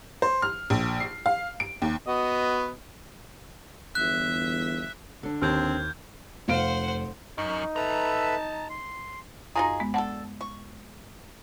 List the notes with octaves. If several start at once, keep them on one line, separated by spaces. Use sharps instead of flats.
C5
F6
A#1
C7
F5
D7
D#2
B3 F#4 D#5
G1 E2 E5 F#6
D3 D4
D#2 C4 F6 G6 G#6
F1 C5 F5 F#5 D7
F#2 D#4 C#6 F6
A4 B4 E5 A5 A#5
C6
F#2 D#4 F4 G#4 C6 A#6
G#3 B3
D4 A4 F#5 A5
C#6